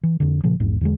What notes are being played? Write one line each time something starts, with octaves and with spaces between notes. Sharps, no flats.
E3
F2 D3
A#2 C#3 F3
A#1 E2 G#2
E2 D3 G#3